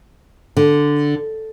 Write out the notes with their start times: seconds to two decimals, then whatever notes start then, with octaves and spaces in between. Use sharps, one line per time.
0.57 D3